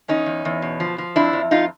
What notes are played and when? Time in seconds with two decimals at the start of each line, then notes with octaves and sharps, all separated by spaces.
0.08 E2 C#4 D#4
0.26 E2
0.45 E2
0.62 B2
0.80 F3
0.98 F3
1.16 F2 D4 E4
1.33 F2
1.51 F2 D#4 F4